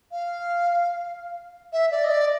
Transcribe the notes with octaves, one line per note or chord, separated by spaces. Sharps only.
F5
E5
D5
D#5
D5